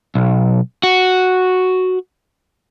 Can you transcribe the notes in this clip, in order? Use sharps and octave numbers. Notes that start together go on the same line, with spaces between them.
B1
F#4